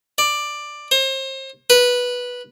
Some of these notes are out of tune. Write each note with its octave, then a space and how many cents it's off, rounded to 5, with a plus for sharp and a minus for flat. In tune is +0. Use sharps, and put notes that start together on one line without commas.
D5 +10
C5 +35
B4 -10